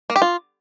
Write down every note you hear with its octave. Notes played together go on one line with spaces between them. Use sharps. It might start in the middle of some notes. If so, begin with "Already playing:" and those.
A#3
G4
F4